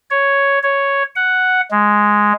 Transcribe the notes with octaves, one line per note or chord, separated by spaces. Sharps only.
C#5
C#5
F#5
G#3